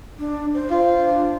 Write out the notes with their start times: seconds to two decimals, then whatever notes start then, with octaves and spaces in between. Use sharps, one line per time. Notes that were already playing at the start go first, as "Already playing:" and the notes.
0.19 D4
0.54 C5
0.71 F4
0.97 D4